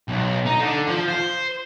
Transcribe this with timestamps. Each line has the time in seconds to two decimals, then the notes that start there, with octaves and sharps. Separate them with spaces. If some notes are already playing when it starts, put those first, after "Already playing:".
0.08 B1
0.46 D#4
0.60 D3
0.87 F3
1.08 C5